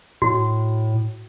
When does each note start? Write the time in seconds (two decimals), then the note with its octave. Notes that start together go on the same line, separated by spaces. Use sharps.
0.22 A2 F#4